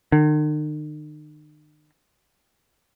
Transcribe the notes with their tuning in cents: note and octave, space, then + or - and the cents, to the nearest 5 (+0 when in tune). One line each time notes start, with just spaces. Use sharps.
D#3 -45